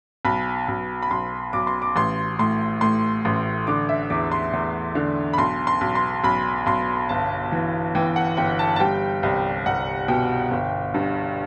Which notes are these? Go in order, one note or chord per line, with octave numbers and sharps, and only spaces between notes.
B1 B5
B1
B5
B1 C6
B1 D6
C6
D6
A1 C6
A2 C6
A2 C6
A1
D3 D6
E5
E2 D6
C6
E2
D3
B5
B1 C6
C6
B1
C6
B1 B5
B1 C6
G1 A5
E3
E3 G5
F#5
G1 G5
A5
A5
G3 G5
C2
C2 F#5
B2 G5
G1
G2